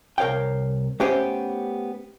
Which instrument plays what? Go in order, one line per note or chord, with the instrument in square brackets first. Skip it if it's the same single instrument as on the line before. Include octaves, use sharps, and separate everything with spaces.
[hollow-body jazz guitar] C2 A#4 C#5 F5 G5
A3 B3 C#4 G4 B4 C5